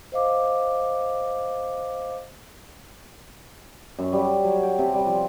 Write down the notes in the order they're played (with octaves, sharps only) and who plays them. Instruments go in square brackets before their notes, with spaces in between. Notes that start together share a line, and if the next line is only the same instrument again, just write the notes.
[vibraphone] C5 D#5 F5 D6
[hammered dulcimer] F#2
G3
F#3
G5
C3
G3
F3